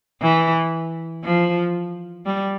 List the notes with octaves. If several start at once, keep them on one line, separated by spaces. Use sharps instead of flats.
E3
F3
G3